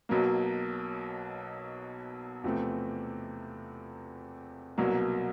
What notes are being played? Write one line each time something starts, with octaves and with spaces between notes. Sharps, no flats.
B1 B2 F#3 A#3
E2 C3 F3 A3 C4
C2 B2 F#3 A#3